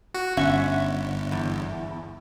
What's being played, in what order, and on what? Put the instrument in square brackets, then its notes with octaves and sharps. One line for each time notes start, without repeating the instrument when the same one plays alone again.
[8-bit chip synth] F#4
[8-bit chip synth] G1 [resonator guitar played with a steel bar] C#4 E5 F#5
[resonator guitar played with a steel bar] E2